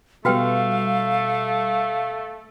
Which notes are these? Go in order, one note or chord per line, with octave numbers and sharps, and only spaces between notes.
B2 G3 A3 F#4 B4 F5 G5